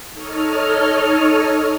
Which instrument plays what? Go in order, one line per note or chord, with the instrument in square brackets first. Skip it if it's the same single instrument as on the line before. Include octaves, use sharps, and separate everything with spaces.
[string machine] D#4 A4 C#5 D#5 F6